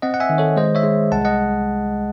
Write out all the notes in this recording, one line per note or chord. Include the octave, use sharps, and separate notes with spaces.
C4 D#5 F#5
F#5
E5 G#5
D#3
A4 C#5
G#3 C5 D#5
C#5 E5
G#3
C2 F#5 A5
D#5 F#5